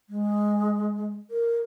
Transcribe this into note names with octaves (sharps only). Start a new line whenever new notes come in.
G#3
A#4